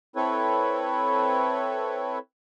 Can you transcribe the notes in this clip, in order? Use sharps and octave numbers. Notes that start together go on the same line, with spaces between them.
C4 E4 A4 B4 C#5